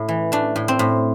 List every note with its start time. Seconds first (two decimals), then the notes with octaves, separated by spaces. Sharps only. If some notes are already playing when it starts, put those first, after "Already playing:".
Already playing: A2
0.09 E3
0.32 A3 D4
0.56 A2
0.68 C4
0.79 A2